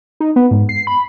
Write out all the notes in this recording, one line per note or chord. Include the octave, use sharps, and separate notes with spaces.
D#4
B3
G#2
C7
B5